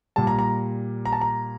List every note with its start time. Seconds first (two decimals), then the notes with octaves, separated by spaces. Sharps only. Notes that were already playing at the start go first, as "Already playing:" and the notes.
0.16 A#2 G3 A5
0.27 A#5
0.39 A#5
1.05 A#5
1.12 A5
1.21 A#5